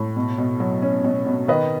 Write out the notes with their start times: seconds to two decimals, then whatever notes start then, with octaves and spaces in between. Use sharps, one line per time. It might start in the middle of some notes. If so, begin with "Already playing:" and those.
Already playing: A2
0.16 B2
0.38 B2
0.60 F#3
0.82 C#4
1.04 B2
1.27 B2
1.48 D#3 B4 D#5